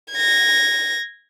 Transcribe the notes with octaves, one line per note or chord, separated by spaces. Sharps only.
G#6 A#6